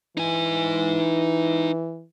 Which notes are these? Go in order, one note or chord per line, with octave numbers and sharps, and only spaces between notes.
E3 D#4 G#5